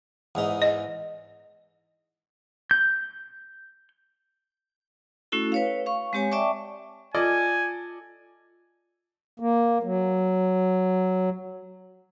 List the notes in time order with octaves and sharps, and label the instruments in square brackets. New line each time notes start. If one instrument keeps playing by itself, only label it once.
[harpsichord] E2 G#2 D#4
[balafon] D#5
[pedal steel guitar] G6
[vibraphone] A3 C#4 E4 F#4 A4
B4 C#5 F5
F5 C#6
G#3 C4 G4 C#5 G#5
D5 E5 G5 A5 C#6 D6
[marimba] F4 D6 G#6 [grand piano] A4 D5 D#5 [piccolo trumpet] G#5
[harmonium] A#3
F#3